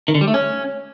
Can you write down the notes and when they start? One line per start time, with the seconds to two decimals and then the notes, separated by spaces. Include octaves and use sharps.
0.08 D#3
0.15 D3
0.21 G3
0.28 A3
0.34 C#4